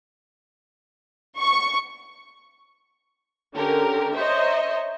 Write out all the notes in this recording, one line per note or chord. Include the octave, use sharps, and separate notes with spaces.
C#6
D3 C#4 G4 A#4
C5 C#5 D#5 E5 A#5